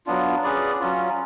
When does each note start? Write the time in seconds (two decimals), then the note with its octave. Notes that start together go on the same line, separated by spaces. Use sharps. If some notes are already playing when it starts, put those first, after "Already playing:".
0.06 F#3 B3 D4 F4
0.43 C#4 G#4 B4 D5
0.80 F#3 C#4 F4